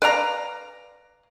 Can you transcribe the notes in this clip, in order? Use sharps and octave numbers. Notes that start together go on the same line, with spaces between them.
B4 D5 F5 A#5